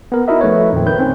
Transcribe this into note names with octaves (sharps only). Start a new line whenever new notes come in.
B3 A#4
D#4 E4 F#4 A#4 D#5 E5
F3 A3 B4 C#5
F2 A#2 D#3 C4
D#3 B4 G6
C4 C#4